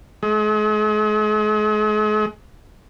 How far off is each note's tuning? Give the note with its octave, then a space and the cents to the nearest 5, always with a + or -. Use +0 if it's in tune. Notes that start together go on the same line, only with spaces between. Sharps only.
G#3 +40